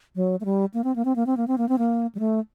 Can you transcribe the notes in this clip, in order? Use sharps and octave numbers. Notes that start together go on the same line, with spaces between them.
F#3
A3
G3
A#3
C4
A#3
C4
A#3
C4
A#3
C4
A#3
C4
A#3
G3
A3